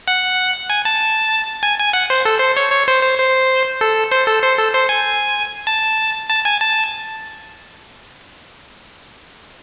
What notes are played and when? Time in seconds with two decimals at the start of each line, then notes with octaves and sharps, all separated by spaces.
0.08 F#5
0.70 G#5
0.85 A5
1.63 G#5
1.79 G#5
1.93 F#5
2.10 C5
2.25 A4
2.40 C5
2.57 C#5
2.72 C#5
2.88 C5
3.03 C5
3.18 C5
3.81 A4
4.12 C5
4.28 A4
4.43 C5
4.58 A4
4.74 C5
4.89 G#5
5.67 A5
6.29 A5
6.45 G#5
6.61 A5